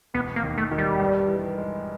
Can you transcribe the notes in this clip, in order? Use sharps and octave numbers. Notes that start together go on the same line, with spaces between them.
E1 B3
A#3
D#2
A3
D#3
G3
G2
E3
G#3